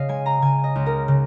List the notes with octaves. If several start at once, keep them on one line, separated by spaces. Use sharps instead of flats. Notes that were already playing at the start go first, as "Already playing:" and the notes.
Already playing: C#3 D#5 F5
G#3 G#5
A#5
C#3 G#5
D#5
C#2
A#4
C#3